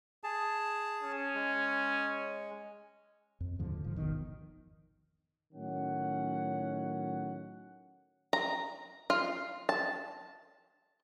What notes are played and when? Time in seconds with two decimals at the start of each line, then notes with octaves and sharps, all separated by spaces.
0.24 G#4 A5
1.03 C#4
1.35 G#3
3.40 F2
3.59 D#2 G#2 D3 F3
3.84 E1 F3
3.97 G#1 F2 B2 D#3
5.53 A2 D#3 F#3 C#4 F#5
8.33 A#5
9.10 F4
9.69 A5